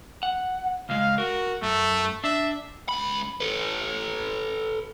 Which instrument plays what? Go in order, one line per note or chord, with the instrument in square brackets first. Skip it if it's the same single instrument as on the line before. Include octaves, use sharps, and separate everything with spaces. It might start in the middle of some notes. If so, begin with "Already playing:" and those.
[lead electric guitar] F#5
[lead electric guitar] C#2 G#3 [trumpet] F5
[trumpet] F#4 [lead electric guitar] A#4
[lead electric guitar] F#2 [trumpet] A3
[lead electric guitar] D4 [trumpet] E5
[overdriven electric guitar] C#2 B5
A4 B4